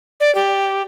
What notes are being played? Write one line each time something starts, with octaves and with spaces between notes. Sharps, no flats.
D5
G4